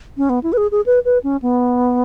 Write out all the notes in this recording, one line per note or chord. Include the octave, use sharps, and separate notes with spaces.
C#4
B3
E4
B4
G#4
G#4
B4
B4
C#4
B3